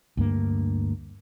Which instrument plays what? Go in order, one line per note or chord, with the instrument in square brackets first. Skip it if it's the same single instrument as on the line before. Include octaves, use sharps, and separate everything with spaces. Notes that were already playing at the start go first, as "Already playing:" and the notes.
[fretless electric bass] D2 G2 A#3